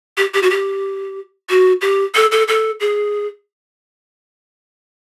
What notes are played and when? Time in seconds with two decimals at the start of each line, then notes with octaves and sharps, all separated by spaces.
0.18 G4
0.34 G4
0.43 F#4
0.51 G4
1.50 F#4
1.82 G4
2.15 A4
2.32 A4
2.48 A4
2.80 G#4